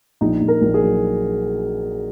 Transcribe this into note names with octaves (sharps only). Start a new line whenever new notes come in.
A#1 D#4
A#1
A#4
A#1
G#4
F#3